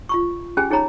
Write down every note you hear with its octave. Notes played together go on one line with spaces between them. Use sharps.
F4 B5 C#6
C#4 G4 G#4 G#5 B5
D#4 G#4 C#5 A#5 B5